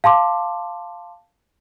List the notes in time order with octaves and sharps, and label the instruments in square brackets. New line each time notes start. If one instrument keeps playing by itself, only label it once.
[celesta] F5 A5 C6 D6